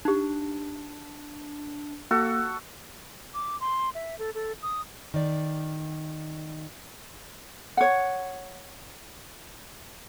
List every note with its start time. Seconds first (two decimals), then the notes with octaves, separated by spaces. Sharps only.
0.05 D4 D#4 G4
2.11 A#3 F#4 A4
3.34 D6
3.61 C6
3.95 E5
4.19 A4
4.35 A4
4.62 D#6
5.14 D#3 D5
7.77 C#5 F#5